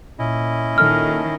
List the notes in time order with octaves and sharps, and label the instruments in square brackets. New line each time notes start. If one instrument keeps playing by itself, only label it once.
[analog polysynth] A#2 [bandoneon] C#4 E4 D#5
[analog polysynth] A#2 A4 [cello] D#3 [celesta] F6